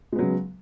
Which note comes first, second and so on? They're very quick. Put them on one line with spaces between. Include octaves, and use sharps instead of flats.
G#3 B3 F#3 C#3